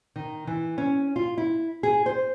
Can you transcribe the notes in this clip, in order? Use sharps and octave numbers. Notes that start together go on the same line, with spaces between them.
D#3
E3
C#4
F4
E4
G#4
C5